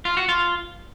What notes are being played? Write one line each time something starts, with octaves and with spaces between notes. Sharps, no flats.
F4
F#4
F4